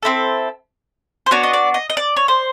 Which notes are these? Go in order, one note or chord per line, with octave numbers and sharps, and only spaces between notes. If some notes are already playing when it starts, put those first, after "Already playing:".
C4 E4 A4
C5
B3 D4 F#4 C#5
D#5
D5
D#5
D#5
D5
C#5
C5